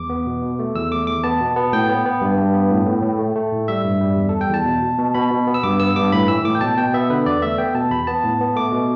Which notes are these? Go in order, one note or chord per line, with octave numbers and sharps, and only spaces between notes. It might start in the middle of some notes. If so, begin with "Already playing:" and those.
Already playing: E2 D6
B3
B2
B2
A3
E2 E6
A3 D6
E2 D6
B3 A5
B2
B3
A2 G5
B3
B3
G2
G2
B3
A2
A2
A2
A3
A3
A2
G3 E5
G2
G3
E2
G3 A4
G5
E2 A5
B2
B2
B2
B2 B5
B2
B3
E6
G2 D6
B3 E6
G2 D6
A2 B5
E3 E6
A2 D6
G5
B2 A5
B2 G5
B3 E5
D3 B4
E2 D5
A3 E5
B3 G5
B2 A5
E2 B5
B3 A5
A2
B3
A3 D6
B2